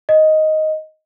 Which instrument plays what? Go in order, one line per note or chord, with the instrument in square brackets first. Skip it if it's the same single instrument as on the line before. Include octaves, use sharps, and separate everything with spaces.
[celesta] D#5